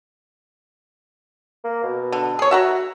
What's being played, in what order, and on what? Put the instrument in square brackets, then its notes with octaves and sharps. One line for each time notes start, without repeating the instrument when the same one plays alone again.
[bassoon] A#3
B2
[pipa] D3
G#4 C#5
[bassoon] F#4 [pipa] E5 F#5 A#5